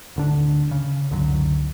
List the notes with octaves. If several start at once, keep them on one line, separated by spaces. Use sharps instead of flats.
D1 D3 D4
C#3
C#2 F#2 D3 F#3